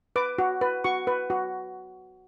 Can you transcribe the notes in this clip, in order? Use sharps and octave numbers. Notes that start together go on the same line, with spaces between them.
B4 D6
F#4
B4
F#4 C#6
B4
F#4